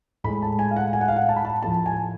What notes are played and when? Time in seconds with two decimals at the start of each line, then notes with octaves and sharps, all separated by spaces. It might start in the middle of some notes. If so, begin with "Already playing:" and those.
0.24 A2 G#3 B5
0.42 A5
0.59 G#5
0.71 F5
0.76 F#5
0.93 G#5
1.01 F#5
1.08 F5
1.16 F#5
1.29 A5
1.36 B5
1.45 A5
1.62 A2 F3 A3 A5
1.86 G#5